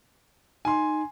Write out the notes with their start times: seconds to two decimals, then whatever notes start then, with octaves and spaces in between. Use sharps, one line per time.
0.65 D#4 G#5 C6